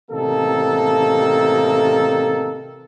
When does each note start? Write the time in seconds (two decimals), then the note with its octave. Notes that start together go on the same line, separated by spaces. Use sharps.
0.10 A1 C3 D#3 A#3 A4